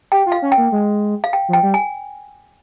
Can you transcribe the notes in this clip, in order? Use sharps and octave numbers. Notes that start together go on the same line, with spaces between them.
G4 G5
F4
F5
C#4
G5
A#3
G#3
F5
G5
F3 G5
G3
G#5